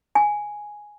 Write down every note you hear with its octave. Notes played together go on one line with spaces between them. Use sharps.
G#5